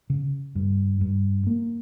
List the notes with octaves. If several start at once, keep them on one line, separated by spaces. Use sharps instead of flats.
C#3
G2
G2
A#3